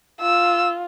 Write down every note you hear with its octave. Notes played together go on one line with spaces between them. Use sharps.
F4 E6